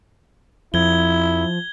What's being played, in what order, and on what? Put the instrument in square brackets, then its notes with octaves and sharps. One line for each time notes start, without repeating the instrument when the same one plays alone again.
[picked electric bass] F2 [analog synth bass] F3 [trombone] E4 [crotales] G#6 G7